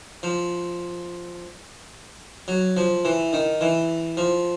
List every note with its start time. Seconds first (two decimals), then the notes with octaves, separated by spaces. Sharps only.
0.23 F3
2.48 F#3
2.77 F3
3.05 E3
3.33 D#3
3.61 E3
4.17 F3